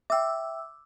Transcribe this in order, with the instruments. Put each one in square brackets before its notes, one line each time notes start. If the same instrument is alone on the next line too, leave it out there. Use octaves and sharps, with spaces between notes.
[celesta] E5 G5 [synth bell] D6 E6